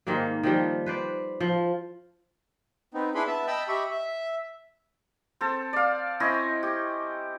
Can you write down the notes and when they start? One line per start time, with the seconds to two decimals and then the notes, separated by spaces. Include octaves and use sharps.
0.07 G#2 D#3 G3 A#3
0.43 D#3 F3 G3
0.86 B4 C5 D5
1.40 F3
2.94 B3 C4 D#4
3.15 D4 E4 G#4 B4 B5 C6
3.27 B3 E5 A5
3.47 D#5 G5 A5 B5 E6
3.68 G4 D#5 E5 B5 C#6
3.91 E5
5.41 C4 A4
5.73 D5 F5
6.20 C4 C#4 E4 D#5
6.63 G4